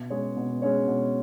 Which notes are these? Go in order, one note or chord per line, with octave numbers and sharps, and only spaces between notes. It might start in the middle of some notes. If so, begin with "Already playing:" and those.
Already playing: B2
G#3 C#4 G#4 C#5
B2
G#3 C#4 G#4 C#5
B2